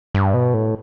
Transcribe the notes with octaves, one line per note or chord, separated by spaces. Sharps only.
G2
B2
A2